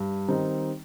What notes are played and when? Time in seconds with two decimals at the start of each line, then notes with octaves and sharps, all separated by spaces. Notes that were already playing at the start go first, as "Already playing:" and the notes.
Already playing: G2
0.28 D#3 G3 C4 D#4